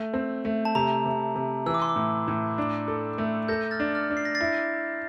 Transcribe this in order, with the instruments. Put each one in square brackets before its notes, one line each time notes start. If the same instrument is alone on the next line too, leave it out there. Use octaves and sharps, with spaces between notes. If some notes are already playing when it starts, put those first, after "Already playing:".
Already playing: [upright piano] A3
C4
A3
[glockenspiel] A5
[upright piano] C3 [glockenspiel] A#5
[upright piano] C3
C3
[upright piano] E3 [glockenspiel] E6
[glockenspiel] D6
C6
D6
[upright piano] A2
A2
D4
A4
A3
[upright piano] A4 [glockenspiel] G6 A#6
[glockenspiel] F6 A6
[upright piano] D4
[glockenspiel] F6 A6
[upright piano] D4
[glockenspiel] C7
A#6
A6 C7
[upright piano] E4